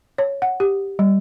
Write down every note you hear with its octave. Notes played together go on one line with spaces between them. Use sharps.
C#5
F#5
G4
G3